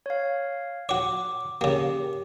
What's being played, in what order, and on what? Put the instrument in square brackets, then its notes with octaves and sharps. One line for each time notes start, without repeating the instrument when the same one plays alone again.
[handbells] C#5 F5
[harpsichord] F#4 C#5 [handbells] D6
[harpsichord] C#3 A#3 [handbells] G4